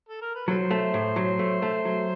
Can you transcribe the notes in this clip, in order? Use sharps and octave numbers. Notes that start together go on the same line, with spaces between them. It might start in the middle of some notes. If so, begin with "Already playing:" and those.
A4
A#4
B4
F#3 A4 C5
A3
A2
F#3
A3
A3
F#3